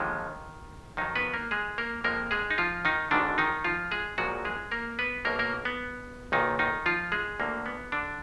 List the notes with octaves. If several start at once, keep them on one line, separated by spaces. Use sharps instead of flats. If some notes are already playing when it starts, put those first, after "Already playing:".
Already playing: D#2 D3 D#3 F3 G#3
F2 D#3 F#3 D#4
B3 B4
A#3 A#4
G#3 G#4
A#3 A#4
F2 F3 G#3 A#3 A#4
G#3 G#4
D#4
F3 F4
D#3 D#4
G#1 G#2 D3 D#3 F#3 D4
D#3 D#4
F3 F4
G#3 G#4
A#1 A#2 F3 F#3 G#3 F#4
G#3 G#4
A#3 A#4
B3 B4
B1 B2 F#3 A#3 A#4
A#3 A#4
B3
B1 A#2 D#3 F#3 D#4
D#3 D#4
F3 F4
G#3 G#4
D2 D3 F#3 A#3
B3
D3 D4